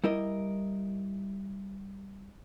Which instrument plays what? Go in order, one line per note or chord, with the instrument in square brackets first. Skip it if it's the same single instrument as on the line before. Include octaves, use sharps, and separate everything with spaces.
[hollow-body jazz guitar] G3 E4 A#4 D#5